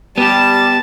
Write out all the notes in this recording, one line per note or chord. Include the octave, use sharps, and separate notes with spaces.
G3 B3 G4 A5